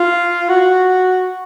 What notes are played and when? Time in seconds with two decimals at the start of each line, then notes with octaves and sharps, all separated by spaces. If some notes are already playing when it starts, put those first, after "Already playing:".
Already playing: F4
0.49 F#4